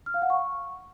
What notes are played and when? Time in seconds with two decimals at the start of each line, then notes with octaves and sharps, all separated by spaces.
0.06 F6
0.14 F5
0.22 F#5
0.30 C#6